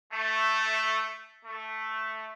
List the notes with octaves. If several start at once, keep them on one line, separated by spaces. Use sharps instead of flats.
A3
A3